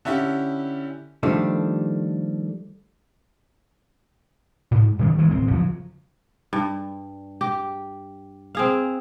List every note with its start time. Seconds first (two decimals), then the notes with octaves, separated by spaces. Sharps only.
0.05 D3 C#4 E4 G4
1.23 D#3 F3 G3 A3 D4
4.71 G#2
4.99 F#2 D#3 F3 G3
5.18 D#3 E3 G#3 A3
5.31 D1 A1 C4
5.51 C#2 F3 F#3
6.53 G2
7.41 G4
8.55 C4 G#4 F5